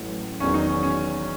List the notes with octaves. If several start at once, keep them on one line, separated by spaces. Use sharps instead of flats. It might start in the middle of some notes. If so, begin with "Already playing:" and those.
Already playing: A1 A2 F#3
E1 E2 D#3 F#3 C#4
D#4
C#4
C#4